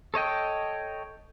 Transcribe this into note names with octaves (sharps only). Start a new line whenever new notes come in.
A4 C#5 D#5 G5